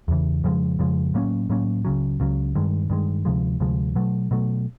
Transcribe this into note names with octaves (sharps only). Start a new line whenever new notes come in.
E2 C#3 E3
F2 C#3 F3 G#3
F2 C#3 F3 G#3
A2 F#3 A#3 C#4
A2 F#3 A#3 C#4
C#2 C#3 F#3
C#2 C#3 F#3
G2 D#3 G#3
G2 D#3 G#3
D2 C3 F3 G#3
D2 C3 F3 G#3
B2 F#3 A3
B2 F#3 A3